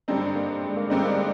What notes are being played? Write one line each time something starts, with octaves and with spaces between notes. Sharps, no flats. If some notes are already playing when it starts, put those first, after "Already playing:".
G2 D3 G3 C4 D4 D#4
A#3
G#3
A#3
G2 D3 G3 G#3 C4 D#4
A#3
G#3